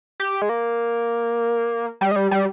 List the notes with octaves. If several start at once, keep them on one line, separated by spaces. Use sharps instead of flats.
G4
G#3
A#3
G3
G#3
G3
G3